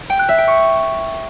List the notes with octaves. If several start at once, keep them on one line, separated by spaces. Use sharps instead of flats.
G5
F#6
E5
G5
C#6